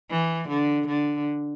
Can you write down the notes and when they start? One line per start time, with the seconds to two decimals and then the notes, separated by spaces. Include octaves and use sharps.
0.10 E3
0.48 D3
0.87 D3